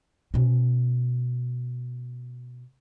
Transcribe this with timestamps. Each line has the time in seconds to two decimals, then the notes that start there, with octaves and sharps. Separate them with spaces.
0.34 B2 C#4